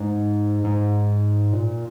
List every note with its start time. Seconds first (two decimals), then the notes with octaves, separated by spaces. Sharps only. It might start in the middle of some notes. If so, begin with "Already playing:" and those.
Already playing: G#2
0.64 G#2
1.53 A#2